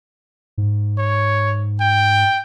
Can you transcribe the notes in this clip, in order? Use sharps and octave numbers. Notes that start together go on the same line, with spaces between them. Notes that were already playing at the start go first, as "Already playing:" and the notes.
G#2
C#5
G5